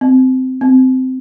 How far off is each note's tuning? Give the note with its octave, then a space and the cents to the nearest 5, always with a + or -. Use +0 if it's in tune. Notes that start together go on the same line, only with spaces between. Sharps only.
C4 -15
C4 -15